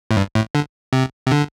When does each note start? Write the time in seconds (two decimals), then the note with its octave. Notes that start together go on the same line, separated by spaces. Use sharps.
0.11 A2
0.17 G2
0.35 A2
0.55 D3
0.93 C3
1.27 C3
1.31 D3